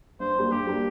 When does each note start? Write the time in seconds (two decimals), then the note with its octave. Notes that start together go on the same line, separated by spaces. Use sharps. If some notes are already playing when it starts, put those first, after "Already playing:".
0.20 G2 C5
0.36 G3 A#3 D4
0.52 G2 G4
0.67 G3 A#3 D4